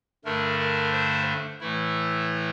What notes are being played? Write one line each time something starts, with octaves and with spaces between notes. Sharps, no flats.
G2 D3 A3 D4 A#4
A#4
C5
A2 E3 A3 E4